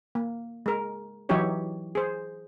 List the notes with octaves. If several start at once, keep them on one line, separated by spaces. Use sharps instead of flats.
A#3
G#3 A#4
E3 F#3 D#4 E4 G4 C#5
G#4 C5